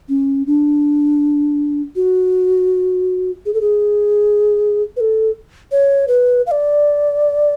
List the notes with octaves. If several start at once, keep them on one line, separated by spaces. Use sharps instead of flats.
C#4
D4
F#4
G#4
A4
G#4
B4
A4
C#5
B4
F5
D5